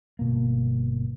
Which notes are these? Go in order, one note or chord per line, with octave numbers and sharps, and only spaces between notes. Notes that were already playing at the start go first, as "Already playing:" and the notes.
G1 B2 A#3